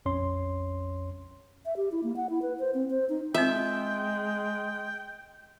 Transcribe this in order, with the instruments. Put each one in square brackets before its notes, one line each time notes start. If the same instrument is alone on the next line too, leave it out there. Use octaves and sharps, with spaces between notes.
[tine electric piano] A#1 F2 C#4 C#5 C6
[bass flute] E5
G4
E4
A#3
F#5
E4
B4
C5
C4
C5
D#4
[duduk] G#3 [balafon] C4 F4 [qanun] E5 [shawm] G5